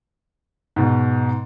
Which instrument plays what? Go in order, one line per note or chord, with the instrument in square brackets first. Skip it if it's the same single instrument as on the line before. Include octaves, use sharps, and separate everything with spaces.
[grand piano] G#2 B2